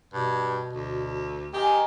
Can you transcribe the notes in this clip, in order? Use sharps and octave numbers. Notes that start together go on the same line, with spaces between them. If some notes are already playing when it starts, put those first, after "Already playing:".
G2 B2
D2
D#3 G4 G#4 A#4